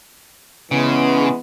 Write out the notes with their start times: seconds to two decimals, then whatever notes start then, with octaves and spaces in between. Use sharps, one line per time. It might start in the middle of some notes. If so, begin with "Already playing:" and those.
0.71 C#3 E3 G#3 B3